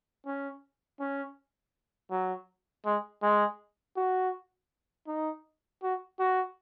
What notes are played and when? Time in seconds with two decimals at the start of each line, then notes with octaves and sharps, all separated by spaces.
0.26 C#4
1.00 C#4
2.11 F#3
2.85 G#3
3.22 G#3
3.97 F#4
5.07 D#4
5.83 F#4
6.20 F#4